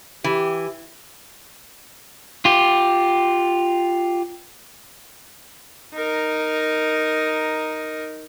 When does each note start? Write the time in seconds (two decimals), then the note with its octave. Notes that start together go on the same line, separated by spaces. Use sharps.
0.24 E3 G4
2.45 F4 G4
5.94 D#4 A#4